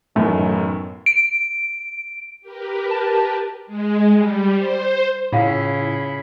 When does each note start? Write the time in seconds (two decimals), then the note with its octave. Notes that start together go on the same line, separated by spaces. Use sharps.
0.16 B1 F#2 A2 D#3 E3 A3
1.06 D7
2.41 G4 A#4 B4
2.91 A5
3.67 G#3
4.14 G3
4.57 C5
5.33 A2 C#3 E4 F4 F5